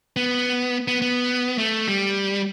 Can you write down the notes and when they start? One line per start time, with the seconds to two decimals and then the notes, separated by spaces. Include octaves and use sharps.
0.16 B3
0.88 B3
1.02 B3
1.58 A3
1.88 G3